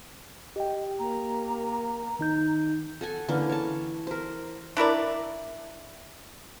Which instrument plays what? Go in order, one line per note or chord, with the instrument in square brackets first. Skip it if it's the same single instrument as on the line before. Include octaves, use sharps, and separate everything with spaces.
[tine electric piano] G4 G5 [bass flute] D#5
[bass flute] A#3 [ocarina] A#5
[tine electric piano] D#3 D#4 G6
[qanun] A4 F#5 G#5
D3 E3 A#3 C#4
C#5 A5
A#4 C5
[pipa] D4 E4 A#4 D5